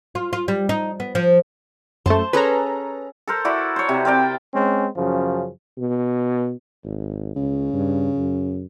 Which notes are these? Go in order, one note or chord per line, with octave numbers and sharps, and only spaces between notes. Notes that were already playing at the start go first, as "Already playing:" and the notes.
F4
F4
G3
D#4
B3
F3
F#2 A3 C5 A5
C#4 G#4 A4 B4 A#5
A4 A#4 C5
E4 F#4 D5
C5 C#5
C3
C4 A#4 D5 G5
G#3 C4 C#4
F#2 C#3 F3
B2
G#1
C#2 C#3
G2
F#2